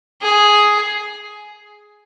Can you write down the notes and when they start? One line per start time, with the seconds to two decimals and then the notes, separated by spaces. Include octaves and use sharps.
0.22 G#4